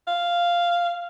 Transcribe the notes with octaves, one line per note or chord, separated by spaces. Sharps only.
F5